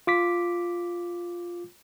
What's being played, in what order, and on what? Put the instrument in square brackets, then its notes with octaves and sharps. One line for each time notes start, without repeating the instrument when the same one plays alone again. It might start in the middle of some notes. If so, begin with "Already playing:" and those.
[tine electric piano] F4 D6 B6